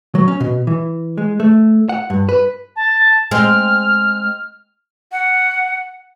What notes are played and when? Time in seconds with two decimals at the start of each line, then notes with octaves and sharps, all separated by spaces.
0.15 F#3
0.28 C#4
0.40 B2
0.67 E3
1.18 G#3
1.40 A3
1.89 F#5
2.10 G2
2.29 B4
2.76 A5
3.31 G#3 C4 F6
5.11 F#5